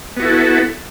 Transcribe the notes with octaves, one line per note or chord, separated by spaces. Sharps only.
B3 E4 F#4 A4